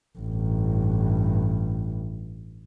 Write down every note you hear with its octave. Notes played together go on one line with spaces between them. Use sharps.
A1 G2